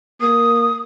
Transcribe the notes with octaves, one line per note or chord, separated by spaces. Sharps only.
A#3 D#6